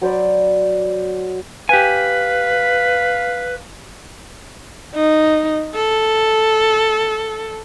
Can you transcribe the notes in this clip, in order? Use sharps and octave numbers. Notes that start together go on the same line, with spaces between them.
F#3 C5 D5 B5
G4 B4 F5 G#5
D#4
A4